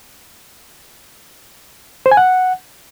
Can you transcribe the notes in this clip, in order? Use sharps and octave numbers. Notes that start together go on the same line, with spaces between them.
C5
G#5
F#5